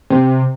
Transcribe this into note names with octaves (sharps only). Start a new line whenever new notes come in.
C3